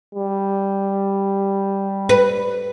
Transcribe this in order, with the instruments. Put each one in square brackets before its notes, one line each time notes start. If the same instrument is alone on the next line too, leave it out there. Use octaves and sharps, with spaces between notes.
[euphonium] G3
[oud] B4